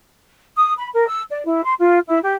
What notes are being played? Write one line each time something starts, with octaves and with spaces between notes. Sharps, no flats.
D#6
B5
A#4
E6
D5
E4
C6
F4
E4
G4